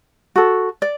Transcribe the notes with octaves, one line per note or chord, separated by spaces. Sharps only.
F#4 A4
D5